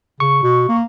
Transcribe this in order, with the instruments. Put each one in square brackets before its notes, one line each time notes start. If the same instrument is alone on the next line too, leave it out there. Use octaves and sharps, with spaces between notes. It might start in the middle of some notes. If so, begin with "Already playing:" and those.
[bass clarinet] C#3 [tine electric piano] C#6
[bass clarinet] B2
A#3